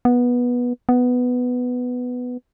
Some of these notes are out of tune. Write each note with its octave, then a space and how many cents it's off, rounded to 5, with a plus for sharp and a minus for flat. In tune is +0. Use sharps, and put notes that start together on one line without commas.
B3 -15
B3 +5